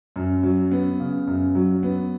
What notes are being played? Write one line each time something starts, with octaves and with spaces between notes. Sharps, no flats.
F#2
F#3
B3
C#3
F#2
F#3
B3